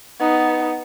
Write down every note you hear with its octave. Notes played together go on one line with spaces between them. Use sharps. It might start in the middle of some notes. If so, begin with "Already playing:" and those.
B3 D#4